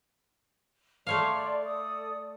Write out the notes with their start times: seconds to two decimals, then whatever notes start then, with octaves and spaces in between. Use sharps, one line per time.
1.07 A3 C#5 D5 F5 A5 C6
1.63 A4 D5 D#6